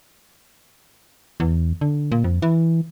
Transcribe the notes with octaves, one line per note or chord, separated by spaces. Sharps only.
E2
D3
A#2
F2
E3